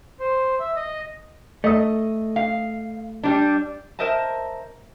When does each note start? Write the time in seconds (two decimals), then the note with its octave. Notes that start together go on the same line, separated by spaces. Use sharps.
0.20 C5
0.60 E5
0.76 D#5
1.64 A3 D#5 D#6
2.36 F5
3.23 G3 D4
3.99 A#4 C5 D#5 E5 A5